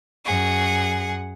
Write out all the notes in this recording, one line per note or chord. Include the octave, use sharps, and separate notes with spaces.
F#2 G#4 F#5